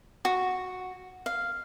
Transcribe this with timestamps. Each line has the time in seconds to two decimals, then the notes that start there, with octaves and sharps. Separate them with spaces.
0.25 F#4
1.26 F5